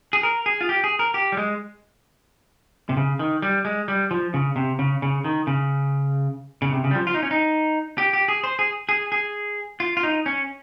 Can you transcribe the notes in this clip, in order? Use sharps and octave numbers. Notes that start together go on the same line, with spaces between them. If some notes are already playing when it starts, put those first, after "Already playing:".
G#4
A#4
G#4
F4
G4
G#4
A#4
G4
G3
G#3
C3
C#3
D#3
G3
G#3
G3
F3
C#3
C3
C#3
C#3
D#3
C#3
C#3
C3
C#3
G3
F3
F4
D#4
C#4
D#4
G4
G4
G#4
C5
G#4
G#4
G#4
F4
F4
D#4
C#4